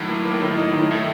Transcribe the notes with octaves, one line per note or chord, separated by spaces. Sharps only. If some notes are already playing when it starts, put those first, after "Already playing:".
Already playing: A2 D#3 F#3
A#3
A#3
D#3
D#4
D#3
A2 A3